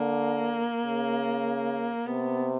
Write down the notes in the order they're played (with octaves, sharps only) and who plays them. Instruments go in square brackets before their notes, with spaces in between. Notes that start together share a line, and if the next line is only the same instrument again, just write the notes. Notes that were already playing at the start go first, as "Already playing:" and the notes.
Already playing: [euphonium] D3 [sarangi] A#3
[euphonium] C#3
[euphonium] C3 [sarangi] B3